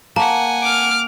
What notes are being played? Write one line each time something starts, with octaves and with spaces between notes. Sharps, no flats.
A#3 F#5 G#5 A5
D6 F6